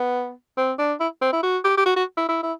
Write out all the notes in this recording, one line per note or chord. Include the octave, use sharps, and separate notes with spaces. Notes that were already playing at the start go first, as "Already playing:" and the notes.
Already playing: B3
C4
D4
E4
C4
E4
F#4
G4
G4
F#4
F#4
E4
E4
E4